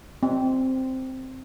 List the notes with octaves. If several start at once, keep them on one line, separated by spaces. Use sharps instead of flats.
C4